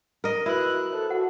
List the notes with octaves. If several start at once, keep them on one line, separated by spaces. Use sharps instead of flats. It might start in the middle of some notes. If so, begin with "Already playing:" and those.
A#4 D#5
E4 F#4 B4 F#6
A4 C5
F#4 F#5